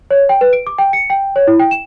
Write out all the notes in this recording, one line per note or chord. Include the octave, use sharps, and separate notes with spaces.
C#5
G5
B4
D7
D6
G5
C#7
G5
C#5
E4
G5
E7